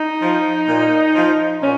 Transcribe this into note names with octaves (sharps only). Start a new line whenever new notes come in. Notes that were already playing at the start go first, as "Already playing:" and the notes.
Already playing: D#4
F3
A#2
F3
A#2 C#4